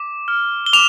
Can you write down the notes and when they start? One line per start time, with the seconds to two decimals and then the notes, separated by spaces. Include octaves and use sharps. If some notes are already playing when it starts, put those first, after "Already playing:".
Already playing: D6
0.28 F6
0.66 G7
0.73 D6 F7